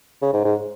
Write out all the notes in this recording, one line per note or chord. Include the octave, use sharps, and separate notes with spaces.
C#3
G#2
G#2